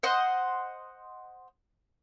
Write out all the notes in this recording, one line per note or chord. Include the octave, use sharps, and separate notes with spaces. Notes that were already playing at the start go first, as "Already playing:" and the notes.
C5 D#5 F#5 C6